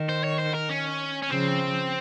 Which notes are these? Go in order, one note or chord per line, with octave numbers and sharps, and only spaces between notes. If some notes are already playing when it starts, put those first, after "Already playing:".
Already playing: D#3
C5
C#5
C5
A#4
C#4
C#4
C#3 F3 C4